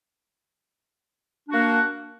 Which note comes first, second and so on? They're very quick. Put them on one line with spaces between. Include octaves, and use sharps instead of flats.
D4 F#4 A#3